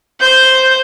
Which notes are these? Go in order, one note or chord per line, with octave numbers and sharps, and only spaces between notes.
C5 G6